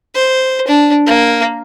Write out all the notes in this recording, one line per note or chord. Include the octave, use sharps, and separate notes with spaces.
C5
D4
A#3